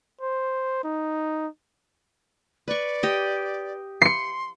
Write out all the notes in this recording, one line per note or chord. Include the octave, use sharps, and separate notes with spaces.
C5
D#4
B4 D5 C#6
G4 D#5
C6 C7 C#7